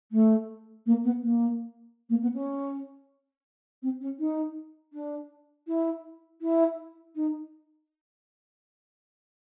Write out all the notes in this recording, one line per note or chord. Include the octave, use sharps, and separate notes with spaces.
A3
A#3
B3
A#3
A#3
B3
C#4
C4
C#4
D#4
D4
E4
E4
D#4